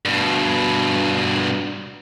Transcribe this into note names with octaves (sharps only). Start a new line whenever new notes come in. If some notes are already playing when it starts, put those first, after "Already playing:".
G2 B2